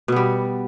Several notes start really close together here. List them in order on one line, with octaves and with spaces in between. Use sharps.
B2 B3 G3